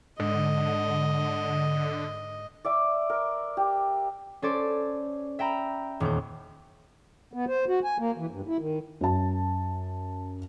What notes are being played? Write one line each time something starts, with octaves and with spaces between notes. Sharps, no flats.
G#2 D3 D#5
D5 E5 D6
A#4
G4
C#4 A4 C5 D5
E5 G5 A#5 B5
D#1 E2 G6
B3
C5
F#4
G#5
A#3
E3
G2
E4
D#3
F#2 A5